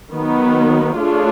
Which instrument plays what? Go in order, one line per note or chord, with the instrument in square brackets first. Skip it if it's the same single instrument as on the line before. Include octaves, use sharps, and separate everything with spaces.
[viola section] D#3 F#3 B3
A3 D4 F4 G#4 C#5